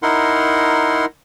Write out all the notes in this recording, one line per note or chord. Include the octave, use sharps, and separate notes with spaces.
D#4 E4 A#4 F#5 C6